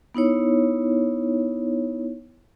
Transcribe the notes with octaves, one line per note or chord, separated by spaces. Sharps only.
B3 D#4 E4 C#5